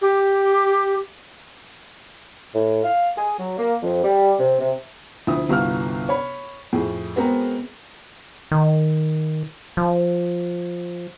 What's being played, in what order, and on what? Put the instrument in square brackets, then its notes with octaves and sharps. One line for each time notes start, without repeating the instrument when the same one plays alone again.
[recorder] G4
[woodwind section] A2
F5
G#4
F#3
A#3
F2
G3
C3
C3
[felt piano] D2 F3 E4 D#6
G1 C2 F#4 F5 F6
C#5 B5
F2 A2 G#4
G#3 B3 C4 F#4 G#4 A#4
[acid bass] D#3
F3